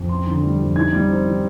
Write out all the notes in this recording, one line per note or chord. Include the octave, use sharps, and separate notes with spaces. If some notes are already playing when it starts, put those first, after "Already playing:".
Already playing: F2
C4 C6
D3
G3
F2
D#4 G#6
G3
C4
D#3